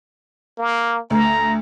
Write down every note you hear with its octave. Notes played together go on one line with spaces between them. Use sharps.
A#3
D2 A#5